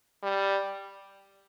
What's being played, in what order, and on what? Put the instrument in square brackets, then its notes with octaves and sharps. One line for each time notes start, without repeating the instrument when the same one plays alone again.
[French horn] G3